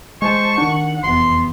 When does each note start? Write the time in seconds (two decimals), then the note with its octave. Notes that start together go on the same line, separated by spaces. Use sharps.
0.22 G#3 C5 A5 C#6
0.58 D#3 D4 F#5
1.04 F1 E2 B3 C6